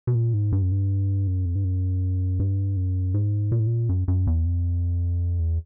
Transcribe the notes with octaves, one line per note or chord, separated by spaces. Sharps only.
B2
A#2
G#2
G2
F#2
G2
F#2
F2
G2
F#2
G2
F#2
G#2
A#2
A2
A#2
F#2
F#2
E2
F2
E2